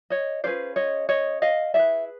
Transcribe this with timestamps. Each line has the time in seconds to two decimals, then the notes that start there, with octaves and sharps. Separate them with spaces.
0.10 C#5 D#5
0.44 C#4 F4 G#4 B4 C5 D5
0.76 C#5 D#5
1.09 C#5 D#5
1.42 D#5 F5
1.74 E4 G#4 B4 D5 E5